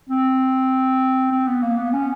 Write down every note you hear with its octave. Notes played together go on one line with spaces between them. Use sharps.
C4
C4
B3
A#3
B3
C#4